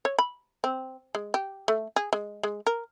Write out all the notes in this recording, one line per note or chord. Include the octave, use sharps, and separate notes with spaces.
C#5
B5
C4
G#3
G4
A3
G#4
G#3
G#3
A#4